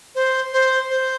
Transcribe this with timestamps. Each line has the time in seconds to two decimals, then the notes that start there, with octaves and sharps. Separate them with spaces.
0.15 C5
0.53 C5
0.90 C5